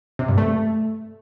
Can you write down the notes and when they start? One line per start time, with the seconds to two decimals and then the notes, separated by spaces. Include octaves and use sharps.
0.19 C3
0.28 G2
0.38 A3